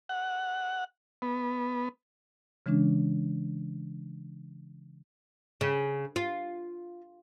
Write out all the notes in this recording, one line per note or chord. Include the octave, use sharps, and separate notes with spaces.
F#5
B3
C#3 E3 G#3 C#4 D4
C#3
F4